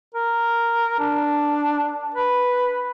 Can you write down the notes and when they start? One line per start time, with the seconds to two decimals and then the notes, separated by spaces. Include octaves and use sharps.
0.14 A#4
0.99 D4
2.14 B4